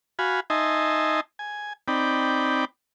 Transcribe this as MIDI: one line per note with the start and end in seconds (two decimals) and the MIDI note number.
0.19 0.40 66
0.19 0.40 77
0.19 0.40 80
0.19 0.40 83
0.50 1.20 63
0.50 1.20 75
0.50 1.20 76
0.50 1.20 80
0.50 1.20 81
0.50 1.20 84
1.39 1.73 80
1.88 2.65 60
1.88 2.65 63
1.88 2.65 74
1.88 2.65 79
1.88 2.65 83